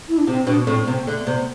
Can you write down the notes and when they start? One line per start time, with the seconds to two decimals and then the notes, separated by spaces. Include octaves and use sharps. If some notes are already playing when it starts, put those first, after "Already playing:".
0.09 E4
0.18 D4
0.27 C3 C4
0.47 B2 D4
0.61 B3
0.67 A2 C4
0.87 C3 B3
1.07 D3 A3
1.27 C3 B3